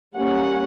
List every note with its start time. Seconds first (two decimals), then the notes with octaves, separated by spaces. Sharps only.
0.15 G3 A#3 C#4 F#5